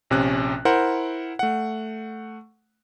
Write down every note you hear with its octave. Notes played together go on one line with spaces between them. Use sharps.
A#1 C3 C#4 F#6
E4 A#4 C5 F#5
A3 F#5